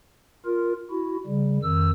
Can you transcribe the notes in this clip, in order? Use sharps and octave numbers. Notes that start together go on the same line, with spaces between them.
F4 A#4
E4 F#4
C#3 G3
F2 D#3 E6